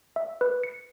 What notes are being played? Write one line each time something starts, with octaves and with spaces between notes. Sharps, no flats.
E5
B4
C#7